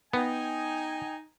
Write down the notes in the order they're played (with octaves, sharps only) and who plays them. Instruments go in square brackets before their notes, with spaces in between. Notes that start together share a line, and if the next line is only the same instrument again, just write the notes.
[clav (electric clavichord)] B3 [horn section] D#4 G#5 [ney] G5